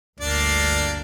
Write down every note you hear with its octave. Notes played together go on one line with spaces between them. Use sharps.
G1 D2 A#3 D4 D5